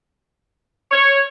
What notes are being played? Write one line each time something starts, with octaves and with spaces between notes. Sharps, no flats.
C#5